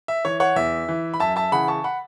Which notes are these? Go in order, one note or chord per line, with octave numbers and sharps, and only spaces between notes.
E5
E3 C#5
C#5 F#5
E2 E5
E3
B5
F#2 E5 A5
E5 A5
C#3 E3 F#5 B5
A5 C#6
F#5 B5